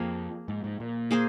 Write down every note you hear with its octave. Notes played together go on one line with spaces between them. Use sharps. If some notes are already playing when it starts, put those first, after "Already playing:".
Already playing: F2 F3 A#3 G#4
G#2
G#2
A#2
A#3 G#4 C5